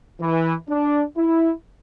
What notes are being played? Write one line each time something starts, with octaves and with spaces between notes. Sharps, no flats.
E3
D4
E4